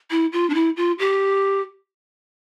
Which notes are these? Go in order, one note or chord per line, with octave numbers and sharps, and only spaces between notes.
E4
F4
D4
E4
F4
G4